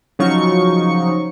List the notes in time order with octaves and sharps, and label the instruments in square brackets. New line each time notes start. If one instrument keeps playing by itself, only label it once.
[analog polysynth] C#3 F3 F#3 D#4 C#6 C#7